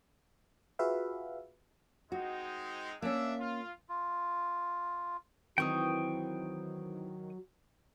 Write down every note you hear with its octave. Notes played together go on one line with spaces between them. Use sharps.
F4 F#4 G#4 B4 E5 F5
G#3 C4 D#4 F#4
A#3 C#4 D4 E5
F4
F4
D#3 E3 F#3 C4 G5 C#6 D#6